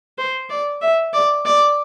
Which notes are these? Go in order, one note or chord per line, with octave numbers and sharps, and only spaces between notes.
C5
D5
E5
D5
D5